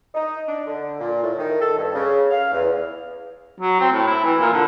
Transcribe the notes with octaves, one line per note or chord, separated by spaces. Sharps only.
D#4
D4
D3
A#2
A2
D#3
A4
G2
C#3
F5
E2
F#3
C4
A2
E4
E3
A#2
D3